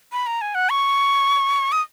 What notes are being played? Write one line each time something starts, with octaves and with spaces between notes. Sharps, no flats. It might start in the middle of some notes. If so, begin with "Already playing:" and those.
B5
A#5
G#5
F#5
C#6
D#6